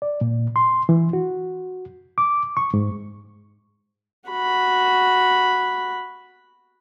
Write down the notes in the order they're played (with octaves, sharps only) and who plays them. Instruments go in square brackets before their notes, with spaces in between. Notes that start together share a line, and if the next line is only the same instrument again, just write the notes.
[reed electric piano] D5
A#2
C6
E3
F#4
D6
C#6
G#2
[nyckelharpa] F#4 B5